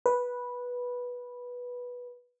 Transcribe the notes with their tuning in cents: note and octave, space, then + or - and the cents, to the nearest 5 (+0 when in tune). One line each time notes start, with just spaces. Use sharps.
B4 -10